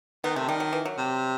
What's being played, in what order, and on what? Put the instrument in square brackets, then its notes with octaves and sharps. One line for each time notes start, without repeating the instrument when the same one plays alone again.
[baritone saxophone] D#3 [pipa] B3
[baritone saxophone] C3 [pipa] A3
[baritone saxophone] D#3 [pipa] G3
[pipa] F#3
E3
F#3
[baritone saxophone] C3